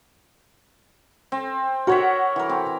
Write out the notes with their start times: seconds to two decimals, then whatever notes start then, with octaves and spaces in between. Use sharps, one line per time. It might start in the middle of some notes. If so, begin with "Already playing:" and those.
1.32 C4
1.87 F#4 A#4 C#5 E5 F#5
2.36 E3 A#4
2.49 C4